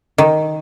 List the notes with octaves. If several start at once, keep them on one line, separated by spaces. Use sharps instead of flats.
D#3